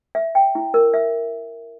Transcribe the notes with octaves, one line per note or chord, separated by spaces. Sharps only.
E5
G5
E4
A#4
E5